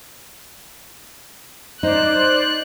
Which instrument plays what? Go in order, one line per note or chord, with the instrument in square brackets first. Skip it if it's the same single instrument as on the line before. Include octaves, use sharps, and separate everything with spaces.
[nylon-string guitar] D#4 [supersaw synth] C5 D5 [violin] F#6